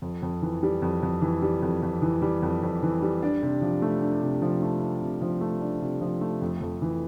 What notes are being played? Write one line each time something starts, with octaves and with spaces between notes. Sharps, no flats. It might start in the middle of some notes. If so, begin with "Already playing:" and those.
F2
F2
E3
G3
F2
F2
E3
G3
F2
F2
E3
G3
F2
F2
E3
G3
D4
C3
F3
A3
D4
C3
F3
A3
D4
C3
F3
A3
D4
C3
F3
A3
F2
F2
E3